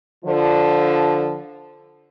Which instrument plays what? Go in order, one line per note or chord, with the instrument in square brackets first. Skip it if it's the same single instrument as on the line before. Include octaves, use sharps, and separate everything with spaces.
[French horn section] D3 F3